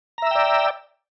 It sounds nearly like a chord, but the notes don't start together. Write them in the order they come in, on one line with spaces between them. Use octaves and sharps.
A#5 E5 E6 G5 D5